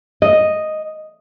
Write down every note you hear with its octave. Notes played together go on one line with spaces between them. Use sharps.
D#5